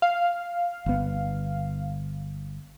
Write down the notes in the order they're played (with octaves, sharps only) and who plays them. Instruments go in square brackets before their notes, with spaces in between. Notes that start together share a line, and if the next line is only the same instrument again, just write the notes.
[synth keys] F5
[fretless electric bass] G1 B3